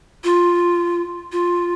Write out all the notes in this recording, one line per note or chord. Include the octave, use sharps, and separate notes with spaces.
F4
F4